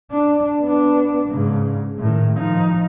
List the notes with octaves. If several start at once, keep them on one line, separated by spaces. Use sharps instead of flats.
D4
B3 D4
G#2 C#3
A2 D#3
F3 D#4